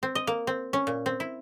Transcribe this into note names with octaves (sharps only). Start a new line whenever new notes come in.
C4
D#5
A#3
C4
C#4
A#2
C4
E4